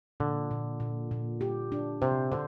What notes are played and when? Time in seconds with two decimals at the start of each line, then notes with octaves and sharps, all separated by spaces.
0.20 A#2 D3
0.51 A#2
0.80 A#2
1.11 A#2
1.41 G4
1.72 D4
2.02 C3 C5
2.32 D3 C5